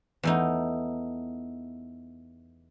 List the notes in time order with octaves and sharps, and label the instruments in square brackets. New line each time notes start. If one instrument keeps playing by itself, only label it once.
[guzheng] E2 A3 D#4